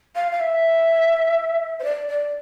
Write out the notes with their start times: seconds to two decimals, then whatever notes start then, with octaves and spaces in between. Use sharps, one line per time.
0.16 F5
0.32 F5
0.40 E5
1.80 C5
1.84 D5
2.08 D5